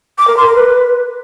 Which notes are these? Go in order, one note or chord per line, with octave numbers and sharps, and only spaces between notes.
D6
A#4
C6
A#4
B4